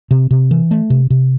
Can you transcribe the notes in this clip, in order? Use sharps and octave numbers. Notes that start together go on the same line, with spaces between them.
C3
C3
E3
A3
C3
C3